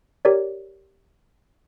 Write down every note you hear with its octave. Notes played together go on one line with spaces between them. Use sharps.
G4 A#4 C#5 D5